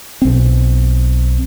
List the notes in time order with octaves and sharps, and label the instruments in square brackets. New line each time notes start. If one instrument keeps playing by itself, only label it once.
[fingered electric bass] B1 C4